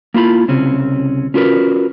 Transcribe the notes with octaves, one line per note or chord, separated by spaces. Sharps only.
A#3 E4 F4 B5
C2 C#3 C4 C#4
C#4 F4 F#4 A#4 B4